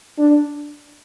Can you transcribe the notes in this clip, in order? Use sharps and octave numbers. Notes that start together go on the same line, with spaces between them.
D4